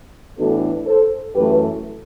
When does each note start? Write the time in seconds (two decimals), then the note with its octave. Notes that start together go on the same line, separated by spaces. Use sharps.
0.37 A2 E3 B3 D4 F#4 A4
0.85 A4 C5
1.34 F#2 E3 A3 G4 B4